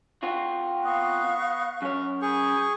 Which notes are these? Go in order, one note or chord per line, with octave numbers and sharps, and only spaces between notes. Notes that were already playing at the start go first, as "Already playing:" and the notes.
C4 F4 F#4
B3 D#5 F5 C#6 F#6
F#2 C#4 C#5
G#4 G#5 B5 C#6 G6